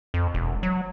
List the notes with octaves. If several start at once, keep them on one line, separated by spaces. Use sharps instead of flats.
F2
E1
F#3